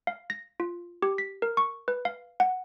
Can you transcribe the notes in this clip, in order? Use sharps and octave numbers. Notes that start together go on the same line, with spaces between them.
F5
A#6
F4
G4
B6
A#4
C#6
B4
F5
F#5